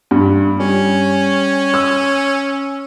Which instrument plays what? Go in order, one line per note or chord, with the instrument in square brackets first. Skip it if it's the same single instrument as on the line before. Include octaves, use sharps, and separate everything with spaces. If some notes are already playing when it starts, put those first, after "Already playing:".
[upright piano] G2
[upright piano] G3 [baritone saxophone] C#4
[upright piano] E6